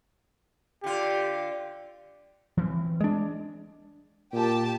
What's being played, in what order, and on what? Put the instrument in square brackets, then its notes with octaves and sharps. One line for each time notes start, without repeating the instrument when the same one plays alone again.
[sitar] D3 F4 [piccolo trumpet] G4
[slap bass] E3 C4
[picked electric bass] G#3 D4
[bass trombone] A#2 [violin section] G4 A5